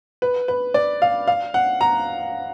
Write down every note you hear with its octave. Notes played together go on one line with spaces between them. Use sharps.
B4
B4
D5
F5
F5
F#5
A#5